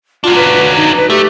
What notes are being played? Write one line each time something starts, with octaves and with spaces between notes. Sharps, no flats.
F#3 D4 F4
B4
D#4
B4
A3 G4